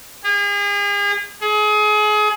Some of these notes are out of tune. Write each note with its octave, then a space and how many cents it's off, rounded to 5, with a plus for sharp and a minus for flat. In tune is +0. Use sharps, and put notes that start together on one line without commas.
G#4 -40
G#4 +30